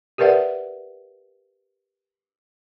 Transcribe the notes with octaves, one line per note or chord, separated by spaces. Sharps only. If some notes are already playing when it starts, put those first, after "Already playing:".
G4 A#4 B4 D5 E5 F#5